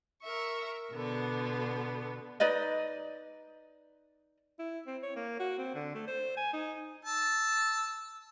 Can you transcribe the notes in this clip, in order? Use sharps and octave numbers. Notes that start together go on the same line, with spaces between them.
A#4 E5 C#6
B2 D3 B3
D#4 B4 D5 D#5
E4
C4
C#5
A#3
F#4
C4
D3
A3
C5
G#5
D#4
A5 E6